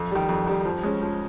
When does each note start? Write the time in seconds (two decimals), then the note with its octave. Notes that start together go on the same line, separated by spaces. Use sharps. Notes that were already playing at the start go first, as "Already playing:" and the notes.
Already playing: F2
0.11 D#3 G3
0.29 F2
0.47 D#3 G3
0.65 F3
0.83 G#3 C#4
1.02 F3